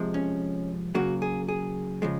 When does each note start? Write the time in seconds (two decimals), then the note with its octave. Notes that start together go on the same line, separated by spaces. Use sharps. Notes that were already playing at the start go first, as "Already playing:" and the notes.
Already playing: C3 F3 G#3
0.14 C#4
0.95 C#3 F#3 A#3 F#4
1.22 G#4
1.48 G#4
2.02 C#3 F3 G#3